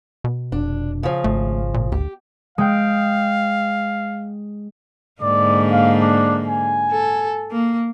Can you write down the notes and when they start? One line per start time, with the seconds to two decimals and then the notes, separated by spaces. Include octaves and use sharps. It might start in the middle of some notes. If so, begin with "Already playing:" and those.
0.24 B2
0.52 F1 D4
1.03 C#3 F3
1.24 G#1 A3
1.74 A#2
1.92 D2 G4
2.58 G#3 F5 G5
5.22 G#2 D3 A#3 D5
5.71 F5
6.01 D4
6.47 G#5
6.91 A4
7.52 A#3